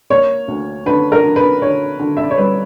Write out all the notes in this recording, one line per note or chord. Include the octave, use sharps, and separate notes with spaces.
A#3 C#5
D2
D3 B4
A#4
D3
B4
D3 C#5
D3
E5
D5
C#5
G3 B4